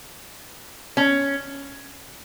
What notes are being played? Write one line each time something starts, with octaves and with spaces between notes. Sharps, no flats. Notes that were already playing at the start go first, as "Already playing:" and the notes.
C#4